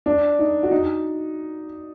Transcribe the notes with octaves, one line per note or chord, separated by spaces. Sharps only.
D4
D#4
F#4
D#4